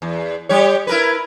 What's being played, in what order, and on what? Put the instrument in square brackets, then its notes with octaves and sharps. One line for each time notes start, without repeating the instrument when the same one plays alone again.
[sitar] E2
G3 G4 C#5
E4 A#4 B4